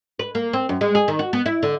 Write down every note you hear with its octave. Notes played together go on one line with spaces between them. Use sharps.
B4
A#3
C4
F#2
G#3
G#4
D#3
F#4
B3
E4
D3